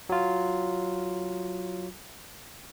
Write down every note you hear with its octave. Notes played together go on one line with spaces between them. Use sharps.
F#3 F4